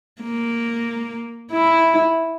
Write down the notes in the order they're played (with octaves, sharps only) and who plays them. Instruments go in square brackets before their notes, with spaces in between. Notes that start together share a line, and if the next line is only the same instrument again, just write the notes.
[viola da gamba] A#3
E4